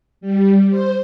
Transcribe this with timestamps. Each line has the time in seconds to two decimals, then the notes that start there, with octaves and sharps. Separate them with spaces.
0.21 G3
0.69 C5